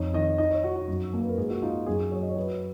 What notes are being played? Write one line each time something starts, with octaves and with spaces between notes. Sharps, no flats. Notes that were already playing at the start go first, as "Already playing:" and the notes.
Already playing: F2 D#4 C#5
D#3 D#5
D#4 D#5
C#5
D#4 F#4
F#4
F#2
A#3
B4
A#4
G#2 G#4
F#4
D#4 F4
F#2 G#4
F#3 C#5
D#5
C#5
F#3 B4